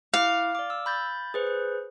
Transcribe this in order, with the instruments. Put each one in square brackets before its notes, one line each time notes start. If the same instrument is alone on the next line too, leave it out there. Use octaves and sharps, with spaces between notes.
[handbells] E4 D6 [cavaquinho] F5
[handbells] D5 D6
E6
B5 G6 A6
G#4 B4 C5